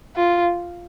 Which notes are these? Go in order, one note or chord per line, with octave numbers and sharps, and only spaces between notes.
F4